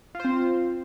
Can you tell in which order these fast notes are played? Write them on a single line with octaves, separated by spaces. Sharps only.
F4 C5 C4